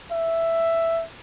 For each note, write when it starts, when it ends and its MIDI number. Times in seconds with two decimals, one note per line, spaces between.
0.12 1.03 76